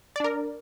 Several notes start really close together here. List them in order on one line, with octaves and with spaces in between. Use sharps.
D5 D4 A#4